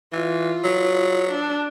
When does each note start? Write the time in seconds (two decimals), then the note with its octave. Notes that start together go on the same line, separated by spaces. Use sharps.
0.12 E3 F4
0.64 F#3
1.31 D4